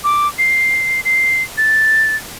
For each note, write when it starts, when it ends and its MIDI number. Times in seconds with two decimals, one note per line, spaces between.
0.04 0.28 86
0.38 1.01 96
1.05 1.43 96
1.58 2.16 93